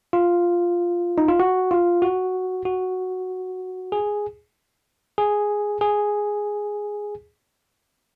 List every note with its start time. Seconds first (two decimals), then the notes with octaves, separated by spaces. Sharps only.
0.13 F4
1.18 D#4
1.28 F4
1.40 F#4
1.71 F4
2.02 F#4
2.65 F#4
3.92 G#4
5.18 G#4
5.81 G#4